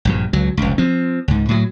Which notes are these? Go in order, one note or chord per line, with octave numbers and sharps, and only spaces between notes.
A#1 G2 A#2
C#2 F#3
F1 C#2
F3 C4
C#2 G#2
A2 F#3